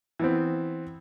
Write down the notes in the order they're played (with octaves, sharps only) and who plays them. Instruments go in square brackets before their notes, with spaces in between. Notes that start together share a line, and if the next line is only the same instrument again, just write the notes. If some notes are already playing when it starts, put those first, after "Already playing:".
[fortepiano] E3 B3 C4